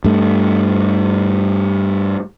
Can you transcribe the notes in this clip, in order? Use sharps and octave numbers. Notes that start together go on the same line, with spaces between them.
G2 A3